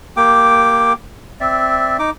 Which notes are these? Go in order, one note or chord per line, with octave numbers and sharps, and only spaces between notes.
A#3 G4 G5 D6
C4 D5 E5
D#4 D6